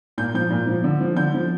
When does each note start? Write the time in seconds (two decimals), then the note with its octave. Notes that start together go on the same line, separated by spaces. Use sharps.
0.18 A#2 G6
0.34 F3 G6
0.50 A#2
0.67 F3
0.84 D3
1.01 F3
1.17 D3 G6
1.33 F3